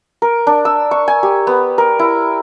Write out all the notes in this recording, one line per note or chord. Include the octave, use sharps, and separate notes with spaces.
A#4
D4
E6
C#6
G#5
G4
B3
A#4
E4